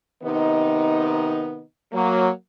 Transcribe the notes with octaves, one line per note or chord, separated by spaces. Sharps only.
C3 D#3 B3 D#4
F#3 A#3